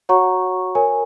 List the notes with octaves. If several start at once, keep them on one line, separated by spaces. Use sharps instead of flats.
F#4 C#5 F#5 A#5 C#6
A#4 C#5 G#5